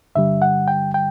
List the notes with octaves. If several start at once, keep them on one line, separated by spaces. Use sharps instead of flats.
G2 D3 G3 E5
F#5
G5
G5